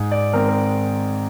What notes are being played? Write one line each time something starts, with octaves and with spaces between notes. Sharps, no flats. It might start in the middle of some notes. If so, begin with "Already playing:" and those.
Already playing: G#2
D5
D#3 G#3 C4 A#4
A#4